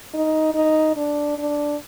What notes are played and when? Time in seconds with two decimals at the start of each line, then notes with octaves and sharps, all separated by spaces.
0.14 D#4
0.54 D#4
0.96 D4
1.38 D4